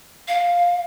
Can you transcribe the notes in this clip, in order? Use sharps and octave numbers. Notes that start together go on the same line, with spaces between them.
F5